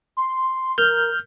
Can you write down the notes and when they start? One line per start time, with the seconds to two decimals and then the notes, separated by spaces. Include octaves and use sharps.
0.17 C6
0.78 A#4 F6 G6